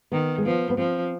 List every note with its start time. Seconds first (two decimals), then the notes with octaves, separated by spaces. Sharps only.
0.12 D#3 B3
0.38 G#3
0.45 F3 B3
0.70 B3
0.78 F3 C4